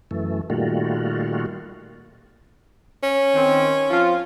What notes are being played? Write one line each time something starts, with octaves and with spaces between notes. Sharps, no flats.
F#2 E3 A3
A#2 D#3 G3 A3 F4 F#4
C#4
D#3 C4
F3 C4 F4